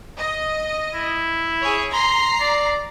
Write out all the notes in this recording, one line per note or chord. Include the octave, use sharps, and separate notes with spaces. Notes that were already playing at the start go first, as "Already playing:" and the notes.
D#5
E4
G#4 C#5
A#5 C6 C7
D5